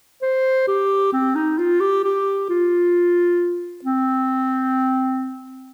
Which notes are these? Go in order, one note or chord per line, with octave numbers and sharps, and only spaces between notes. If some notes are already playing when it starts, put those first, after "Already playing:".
C5
G4
C4
D#4
F4
G4
G4
F4
C4